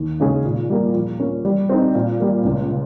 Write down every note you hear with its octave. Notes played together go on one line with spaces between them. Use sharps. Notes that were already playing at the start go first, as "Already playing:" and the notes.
Already playing: D#2
C#3 G#3 C#4 G#4
A#2
G3 A#3
F3
A#3 C#4
G3
C4 D#4
A#2
G3 A#3
C#2
C#3